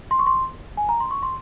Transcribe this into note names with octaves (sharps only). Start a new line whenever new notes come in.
C6
C#6
C6
G#5
A#5
C6
C#6
C6